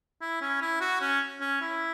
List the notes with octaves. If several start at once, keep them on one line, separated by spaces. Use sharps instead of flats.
E4
C#4
E4
F#4
C#4
C#4
E4